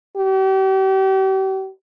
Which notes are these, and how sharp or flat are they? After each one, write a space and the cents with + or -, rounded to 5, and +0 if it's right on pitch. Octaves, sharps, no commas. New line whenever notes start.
G4 -40